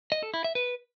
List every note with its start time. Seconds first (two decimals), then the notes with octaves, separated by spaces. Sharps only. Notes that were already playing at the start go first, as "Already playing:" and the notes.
0.12 D#5
0.23 A4
0.34 E4
0.44 E5
0.55 B4